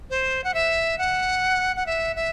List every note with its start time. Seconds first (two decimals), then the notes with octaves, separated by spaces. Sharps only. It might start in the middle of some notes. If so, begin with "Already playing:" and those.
0.10 C5
0.44 F#5
0.54 E5
0.98 F#5
1.76 F#5
1.86 E5
2.16 E5